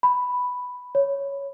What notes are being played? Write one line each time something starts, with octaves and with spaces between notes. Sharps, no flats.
B5
C#5